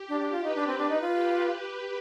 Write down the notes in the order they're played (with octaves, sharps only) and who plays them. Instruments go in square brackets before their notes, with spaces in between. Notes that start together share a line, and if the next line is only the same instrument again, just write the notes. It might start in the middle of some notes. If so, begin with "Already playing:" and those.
Already playing: [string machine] G4
[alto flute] D4
D4
F4
[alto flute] D#4 [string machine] B4
[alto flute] D4
C4
D4
D#4
F4
[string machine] G4